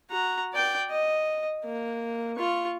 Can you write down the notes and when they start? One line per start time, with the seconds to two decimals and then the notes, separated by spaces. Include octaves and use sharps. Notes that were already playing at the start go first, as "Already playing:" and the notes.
0.10 F#4 A#5
0.53 D5 G5
0.90 D#5
1.65 A#3
2.36 F4 C#6